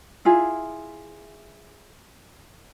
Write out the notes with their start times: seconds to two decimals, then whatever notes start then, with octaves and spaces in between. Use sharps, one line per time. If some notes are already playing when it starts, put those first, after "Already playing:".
0.25 E4 F4 G#4 E5